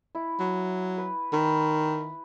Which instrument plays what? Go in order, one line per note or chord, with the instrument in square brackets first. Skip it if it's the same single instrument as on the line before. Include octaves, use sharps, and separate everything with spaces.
[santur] E4
[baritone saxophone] F#3
[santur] B4
[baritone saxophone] D#3 [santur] B4